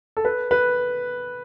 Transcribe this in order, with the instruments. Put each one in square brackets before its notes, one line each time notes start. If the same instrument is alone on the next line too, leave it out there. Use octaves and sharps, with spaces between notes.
[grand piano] A4
B4
B4